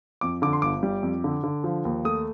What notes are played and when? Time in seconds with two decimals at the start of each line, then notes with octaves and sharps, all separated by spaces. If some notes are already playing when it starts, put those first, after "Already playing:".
0.21 F2 D6
0.42 D3 D6
0.53 C6
0.62 G1 D6
0.83 G3
1.03 F2
1.24 D3
1.44 D3
1.64 F3
1.85 D#2
2.05 A3 D#6